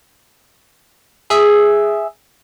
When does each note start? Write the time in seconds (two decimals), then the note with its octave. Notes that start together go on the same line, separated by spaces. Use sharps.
1.30 G#4 E5